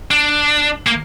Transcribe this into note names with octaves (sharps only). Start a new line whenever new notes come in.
D4
A#3